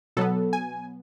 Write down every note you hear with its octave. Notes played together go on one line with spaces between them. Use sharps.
B2 F#3 B3 A4
G#5